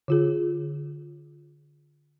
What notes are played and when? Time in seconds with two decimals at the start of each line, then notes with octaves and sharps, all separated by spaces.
0.08 D3 F4 G#4